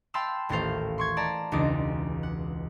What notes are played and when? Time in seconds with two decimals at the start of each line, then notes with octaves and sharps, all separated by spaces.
0.14 F5 G5 A5 B5 C6 E6
0.49 D#1 A1 A4 C5 F5
0.98 C6 C#6 G#6
1.17 D5 A5 A#5
1.52 E1 C#2 D4 D#4 D6 A#6
2.23 F#5